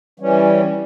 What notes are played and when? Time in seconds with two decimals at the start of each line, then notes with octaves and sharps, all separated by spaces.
0.20 E3 G3 C#4